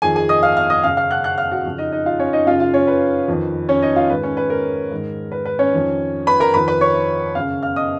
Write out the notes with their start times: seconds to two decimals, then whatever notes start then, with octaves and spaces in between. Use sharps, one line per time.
0.02 F2 D#3 G#4 G#5
0.16 G#4 G#5
0.29 D#5 D#6
0.43 F5 F6
0.57 F5 F6
0.70 D#5 D#6
0.83 F#2 C#3 F5 F6
0.97 F5 F6
1.11 F#5 F#6
1.24 F#5 F#6
1.38 F5 F6
1.51 F#4 F#5
1.65 F2 C#3
1.78 D#4 D#5
1.92 D#4 D#5
2.06 F4 F5
2.19 C#4 C#5
2.33 D#4 D#5
2.46 F#2 C#3 F4 F5
2.60 F4 F5
2.73 C#4 C#5
2.87 B4
3.28 F2 D#3
3.69 C#4 C#5
3.82 D#4 D#5
3.96 F4 F5
4.10 G#2 D#3 B4
4.23 C#4 C#5
4.37 B4
4.50 A#4
4.91 G#2 D#3
5.32 B4
5.45 B4
5.59 C#4 C#5
5.72 F2 D#3
6.27 B4 B5
6.40 A#4 A#5
6.54 F2 D#3 B4 B5
6.68 B4 B5
6.81 C#5 C#6
7.35 F#2 C#3 F5 F6
7.63 F5 F6
7.76 D#5 D#6